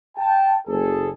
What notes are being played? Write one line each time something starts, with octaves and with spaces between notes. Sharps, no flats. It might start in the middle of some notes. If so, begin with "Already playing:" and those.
G5 A5
F#1 G#4 A4